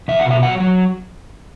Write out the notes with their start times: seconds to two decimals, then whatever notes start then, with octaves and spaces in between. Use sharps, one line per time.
0.08 E2 E5
0.19 F#5
0.26 B2 E5
0.43 F#3 F#5
0.60 F#3